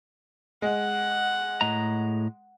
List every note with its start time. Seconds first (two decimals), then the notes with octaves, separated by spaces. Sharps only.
0.62 G#3 F#5
1.61 A2 D#5 A#5